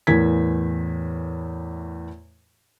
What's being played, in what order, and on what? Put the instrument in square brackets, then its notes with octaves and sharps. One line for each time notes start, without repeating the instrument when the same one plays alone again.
[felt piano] E2 A2 E3 A#4 G#6 B6